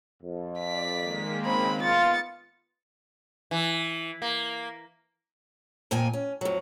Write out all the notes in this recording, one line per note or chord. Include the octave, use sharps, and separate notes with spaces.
F2
D5 B6
D#3 G#3 A#3
C#3 C4 B5
B3 F4 A6 C#7
E3
A#3
F2 A#2 A#3 G5 G#5
C#4
F2 F#3